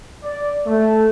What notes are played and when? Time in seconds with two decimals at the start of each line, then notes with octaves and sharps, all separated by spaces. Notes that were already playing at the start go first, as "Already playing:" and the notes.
0.23 D5
0.66 A3